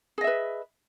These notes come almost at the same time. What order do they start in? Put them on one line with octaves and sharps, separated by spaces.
G#4 D#5 E5 B4